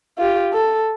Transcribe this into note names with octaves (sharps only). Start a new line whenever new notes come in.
F4 G4
A4